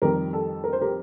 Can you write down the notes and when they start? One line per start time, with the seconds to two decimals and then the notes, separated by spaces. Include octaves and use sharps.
0.02 F2 D#3 G3 G4 A#4
0.33 A4
0.64 A#4
0.73 C5
0.81 G4 A#4